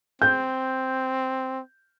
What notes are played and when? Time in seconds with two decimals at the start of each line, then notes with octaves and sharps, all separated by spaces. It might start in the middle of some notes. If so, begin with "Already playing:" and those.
0.22 C4 G6